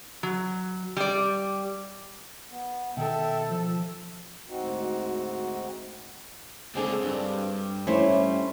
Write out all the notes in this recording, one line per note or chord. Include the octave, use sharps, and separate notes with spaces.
F#3
G3 D5
B3
B2 D#3 A4 E5 G5
F3 E6
D2 G#2 C4 D#4 F#4
C#2 D3 C4 G#4 A4
G2
A3 C#4 E4 C5 C#5